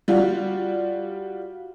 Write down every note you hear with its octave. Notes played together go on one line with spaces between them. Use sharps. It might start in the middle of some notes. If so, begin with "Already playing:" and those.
G3 F4 F#4